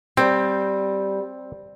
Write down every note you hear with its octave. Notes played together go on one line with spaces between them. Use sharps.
G3 C4